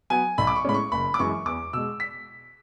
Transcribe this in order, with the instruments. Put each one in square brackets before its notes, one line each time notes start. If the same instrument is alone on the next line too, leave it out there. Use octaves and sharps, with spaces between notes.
[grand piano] F#3 B3 G#5
B1 B5
D6
C#6
A2 G#3 C#4 B5
C#6
F#1 B5
D6
F#2 E3 G#3 C#6
E2 D6
B2 G#3 E6
B6